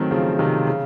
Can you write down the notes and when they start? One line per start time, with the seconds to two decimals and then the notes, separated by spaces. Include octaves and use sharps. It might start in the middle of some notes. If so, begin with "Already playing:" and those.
Already playing: D#3 F#3 A3 C4
0.11 C#3 F3
0.39 C3 D#3
0.67 C#3